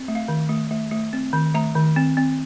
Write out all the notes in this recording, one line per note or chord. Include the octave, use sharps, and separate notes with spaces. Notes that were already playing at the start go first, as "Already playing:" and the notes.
Already playing: C4
A3
F5
D#3
A3
A3
A3
C4
D#3
A3 A#5
D#3
C4
C4